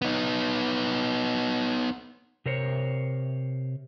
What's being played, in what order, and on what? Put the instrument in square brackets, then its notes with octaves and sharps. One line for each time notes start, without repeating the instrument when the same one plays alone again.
[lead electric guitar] B3 D#4
[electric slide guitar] C3 A#4 C5 C#5